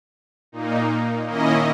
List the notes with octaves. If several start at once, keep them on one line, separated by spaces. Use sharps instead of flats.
A#2 A#3 D#4
D#3 A#3 C#4 E4 D#5